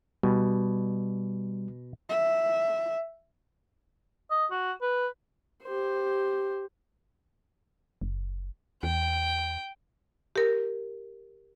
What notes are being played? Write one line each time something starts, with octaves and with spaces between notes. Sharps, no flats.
B2 G3
E5
D#5
F#4
B4
G4 C5
F#1
E2 G5
G4 A#4